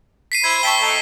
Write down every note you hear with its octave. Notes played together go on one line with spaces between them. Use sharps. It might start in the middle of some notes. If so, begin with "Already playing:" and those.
B6 C7 D#7
E4 C5 G#6
E5 G5 A5 C#6 B6 G7
A3 D#4 A4